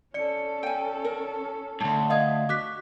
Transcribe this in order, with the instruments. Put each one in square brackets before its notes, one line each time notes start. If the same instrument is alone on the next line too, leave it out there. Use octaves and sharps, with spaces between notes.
[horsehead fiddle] C#4 A4 [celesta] D5 C#7
[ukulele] G5 G#5
A#4
[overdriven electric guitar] D2 G#2 [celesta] A5
[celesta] D#5 D#6 G#6 [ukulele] F5
[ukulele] F#4 [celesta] D6 F#6 B6